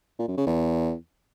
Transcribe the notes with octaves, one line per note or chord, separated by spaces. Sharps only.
A#2
F#2
C#3
E2